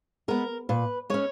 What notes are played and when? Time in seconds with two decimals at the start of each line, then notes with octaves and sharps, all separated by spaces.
0.28 G#3 B3 A#4
0.69 A#2 B4
1.10 G#3 C#4 C#5